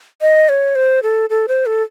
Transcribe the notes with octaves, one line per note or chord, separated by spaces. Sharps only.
D#5
C#5
C5
A4
A4
C5
A4